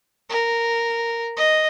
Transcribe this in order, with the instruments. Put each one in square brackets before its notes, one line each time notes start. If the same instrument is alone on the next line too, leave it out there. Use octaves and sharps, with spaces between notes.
[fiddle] A#4
D#5